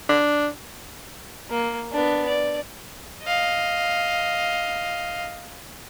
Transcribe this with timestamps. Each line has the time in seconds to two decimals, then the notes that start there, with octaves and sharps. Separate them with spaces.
0.09 D4
1.50 A#3
1.92 B3 D4
2.27 D5
3.24 D#5 F5